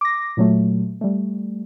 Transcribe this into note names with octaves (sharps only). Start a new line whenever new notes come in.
D6 A#6
A#2 F#3 A3
G3 A3